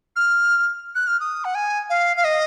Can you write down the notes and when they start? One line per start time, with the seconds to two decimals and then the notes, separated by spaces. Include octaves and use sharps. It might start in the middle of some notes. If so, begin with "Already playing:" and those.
0.16 F6
0.95 F#6
1.07 F6
1.20 D#6
1.45 F#5
1.55 G#5
1.90 F5
2.17 F5
2.24 D#5